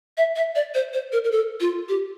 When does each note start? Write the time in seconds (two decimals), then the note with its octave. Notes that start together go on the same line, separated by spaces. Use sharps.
0.17 E5
0.36 E5
0.56 D5
0.74 C5
0.93 C5
1.12 A#4
1.24 A#4
1.32 A4
1.60 F4
1.89 G4